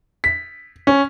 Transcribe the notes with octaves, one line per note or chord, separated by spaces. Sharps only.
B6
C#4